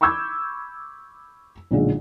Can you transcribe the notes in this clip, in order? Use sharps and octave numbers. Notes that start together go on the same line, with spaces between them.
B5 C#6 D6 E6 G6 G#6
B1 A#2 D3 G#3